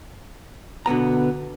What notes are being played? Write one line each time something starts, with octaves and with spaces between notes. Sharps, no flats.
B2 D3 B3 A#5